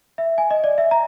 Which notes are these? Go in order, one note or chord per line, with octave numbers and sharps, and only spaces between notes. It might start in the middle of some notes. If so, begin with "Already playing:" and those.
E5
G#5
D#5
D5
E5
A#5